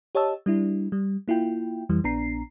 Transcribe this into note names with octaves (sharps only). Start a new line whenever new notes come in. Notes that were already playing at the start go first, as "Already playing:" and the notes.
G4 C#5 D#5 A5 E6
G3 D4 E4
G3
A#3 E4 F4 G5
F2 E3 G3
A#1 B3 D4 A#5 C7